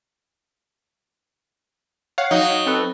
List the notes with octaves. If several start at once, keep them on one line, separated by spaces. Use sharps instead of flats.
C#5 F5 F#5
F#3 D#4
C4 A4 B4